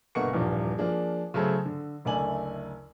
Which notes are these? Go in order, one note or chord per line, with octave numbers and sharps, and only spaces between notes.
G1 B2 A#3 F#5 C#6 C#7
D#1 E2 G2 F3 D5
F3 A#3 D4 G#4
C#3 F#3 A3 G#4 A4 C5
D3
F#1 D2 A3 D5 G#5 F#7